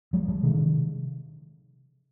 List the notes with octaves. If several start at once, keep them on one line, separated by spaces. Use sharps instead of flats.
F3 G#3
F3 G#3
C3 D#3